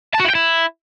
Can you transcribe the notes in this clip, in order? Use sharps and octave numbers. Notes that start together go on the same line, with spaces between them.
A5
F#4
E4
G5
E4